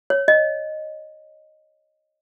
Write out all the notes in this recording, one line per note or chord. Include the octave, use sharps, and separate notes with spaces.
C#5
D#5